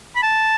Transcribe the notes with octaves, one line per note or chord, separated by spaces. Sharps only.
B5
A5